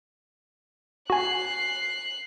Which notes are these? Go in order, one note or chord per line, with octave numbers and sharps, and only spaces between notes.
F#4 G#5 F#6 C7